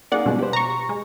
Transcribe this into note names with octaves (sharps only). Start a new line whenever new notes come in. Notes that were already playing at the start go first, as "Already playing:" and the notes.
A#3 D#4 G#4 D5 F#5
B2 F3 G3 G#3
G4 B4 C5
A#5 C#6
G#3